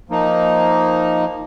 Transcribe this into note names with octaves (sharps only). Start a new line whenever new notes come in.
F3 A#3 D#4